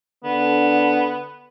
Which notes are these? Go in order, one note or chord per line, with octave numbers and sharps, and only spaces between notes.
D3 B3